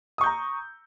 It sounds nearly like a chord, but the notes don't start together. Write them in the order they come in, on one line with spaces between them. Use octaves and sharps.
D#6 C#6 G6 A#5